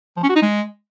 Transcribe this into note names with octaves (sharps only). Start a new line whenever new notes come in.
F3
C#4
F#4
D#4
G#3